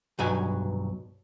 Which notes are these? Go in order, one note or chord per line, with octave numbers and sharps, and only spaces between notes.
B1 G2 F#3 G#5